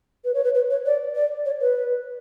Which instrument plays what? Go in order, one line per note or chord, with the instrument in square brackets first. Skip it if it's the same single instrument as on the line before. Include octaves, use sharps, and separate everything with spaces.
[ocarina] B4
C#5
B4
B4
C#5
D5
D5
C#5
B4